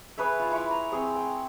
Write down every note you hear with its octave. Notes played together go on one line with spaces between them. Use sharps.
G#4 B4 C#5 E5
F4
E4 C#6 D6
A#5
C4 G#4 C#5
G5